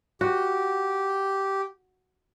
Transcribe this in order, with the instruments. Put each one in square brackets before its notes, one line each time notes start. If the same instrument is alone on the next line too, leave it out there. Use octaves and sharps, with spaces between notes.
[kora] F#4 [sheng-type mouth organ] G4